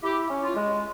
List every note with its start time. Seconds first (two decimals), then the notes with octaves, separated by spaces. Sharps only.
0.03 E4 G4
0.30 C#4
0.43 F4
0.56 G#3